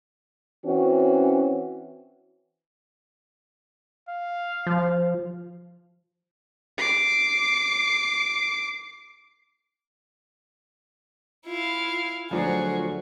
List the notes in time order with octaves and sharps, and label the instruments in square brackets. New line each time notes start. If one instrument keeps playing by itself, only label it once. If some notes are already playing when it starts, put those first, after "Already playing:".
[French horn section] E3 C4 C#4 F#4
[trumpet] F5
[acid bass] F3
[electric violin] D6 C7
[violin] E4 F5 [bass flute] F4
[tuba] D2 [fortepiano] F3 F#3 D4 [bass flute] F4 [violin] F#4 G#4